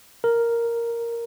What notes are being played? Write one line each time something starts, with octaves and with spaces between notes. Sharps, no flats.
A#4